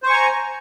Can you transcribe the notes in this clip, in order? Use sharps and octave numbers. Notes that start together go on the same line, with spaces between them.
C5 G#5 A#5 C#6